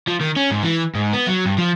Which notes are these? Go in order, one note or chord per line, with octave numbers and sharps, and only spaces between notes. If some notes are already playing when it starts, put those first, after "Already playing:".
F3
D#3
C#4
G#2
E3
G#2
B3
F#3
G2
F3